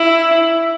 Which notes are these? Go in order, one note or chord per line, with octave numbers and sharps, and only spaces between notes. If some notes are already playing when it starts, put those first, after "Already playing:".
Already playing: E4